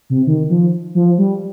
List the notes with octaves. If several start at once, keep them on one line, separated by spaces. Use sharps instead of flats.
C3
D#3
F3
F3
G3